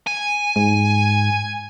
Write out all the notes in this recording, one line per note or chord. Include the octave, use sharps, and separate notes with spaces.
G#5
G#2